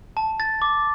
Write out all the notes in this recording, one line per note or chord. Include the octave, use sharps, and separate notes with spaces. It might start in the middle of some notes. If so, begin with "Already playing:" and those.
A5
A6
D6